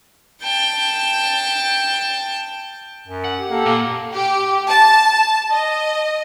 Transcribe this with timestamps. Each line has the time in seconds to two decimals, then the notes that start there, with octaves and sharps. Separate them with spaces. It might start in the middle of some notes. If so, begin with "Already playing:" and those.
0.43 G5 A5
3.07 F#2
3.24 F#5
3.38 G4
3.50 A#3 G4 A4
3.65 A#2 A#3
4.14 G4
4.70 A5
5.53 D#5